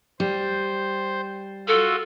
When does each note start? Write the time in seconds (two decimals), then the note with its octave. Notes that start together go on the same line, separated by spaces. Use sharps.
0.20 G3 C5
1.68 F4 F#4 A4